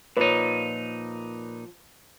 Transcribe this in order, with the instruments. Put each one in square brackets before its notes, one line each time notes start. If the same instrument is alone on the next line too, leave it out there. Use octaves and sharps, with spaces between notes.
[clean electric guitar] A#2 D#4 [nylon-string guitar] F3 C#5 [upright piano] B4